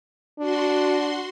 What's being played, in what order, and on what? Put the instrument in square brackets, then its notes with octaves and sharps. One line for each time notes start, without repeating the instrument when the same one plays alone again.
[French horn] D4 [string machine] F#4 C6